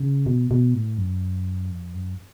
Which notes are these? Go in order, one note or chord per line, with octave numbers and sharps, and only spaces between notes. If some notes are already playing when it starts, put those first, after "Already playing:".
Already playing: C#3
B2
B2
A2
F#2
F2
F#2